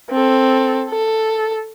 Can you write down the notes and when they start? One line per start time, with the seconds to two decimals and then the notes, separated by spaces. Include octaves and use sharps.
0.10 C4 A4
0.90 A4